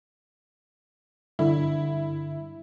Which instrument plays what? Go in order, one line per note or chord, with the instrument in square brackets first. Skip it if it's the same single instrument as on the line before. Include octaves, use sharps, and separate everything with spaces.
[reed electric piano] G2 D3 [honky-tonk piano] E4